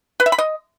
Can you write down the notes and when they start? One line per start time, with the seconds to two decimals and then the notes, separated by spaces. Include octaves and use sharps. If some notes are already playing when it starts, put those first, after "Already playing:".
0.20 B4
0.26 E5
0.32 B5
0.39 D#5